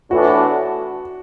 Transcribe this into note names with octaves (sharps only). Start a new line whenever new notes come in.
A2 E3 B3 D4 F#4 A4